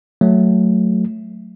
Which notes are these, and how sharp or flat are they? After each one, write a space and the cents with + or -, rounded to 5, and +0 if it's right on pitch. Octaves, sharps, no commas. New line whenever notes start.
F#3 +0 A3 +0